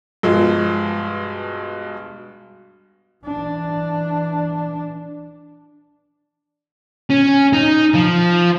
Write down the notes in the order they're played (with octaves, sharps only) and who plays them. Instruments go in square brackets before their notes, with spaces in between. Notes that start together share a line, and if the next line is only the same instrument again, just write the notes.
[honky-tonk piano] G2 B2 F3 G#3
[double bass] E3 D4
[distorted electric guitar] C#4
D#4
F3